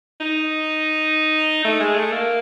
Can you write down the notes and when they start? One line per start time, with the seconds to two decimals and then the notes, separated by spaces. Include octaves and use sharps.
0.21 D#4
1.65 A3
1.80 G#3
1.96 A3
2.12 A#3